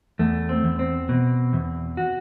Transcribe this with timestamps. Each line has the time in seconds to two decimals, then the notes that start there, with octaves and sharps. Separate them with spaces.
0.19 E2 A3
0.49 C4
0.64 E2
0.79 C4
1.09 B2
1.53 E2
1.97 F#4